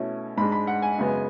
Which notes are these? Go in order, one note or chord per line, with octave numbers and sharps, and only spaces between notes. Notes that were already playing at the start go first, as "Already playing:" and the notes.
Already playing: B2 A3 C#4 E4
G#2 G#3 D4 B5
B5
F#5
G#5
F#2 C#3 G#3 B3